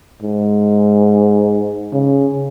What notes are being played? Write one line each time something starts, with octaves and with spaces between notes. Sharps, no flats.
G#2
C#3